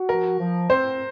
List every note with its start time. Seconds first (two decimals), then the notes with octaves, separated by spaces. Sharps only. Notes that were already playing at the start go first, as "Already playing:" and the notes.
Already playing: F#4
0.08 F3 A#4
0.40 F3
0.70 C4 C5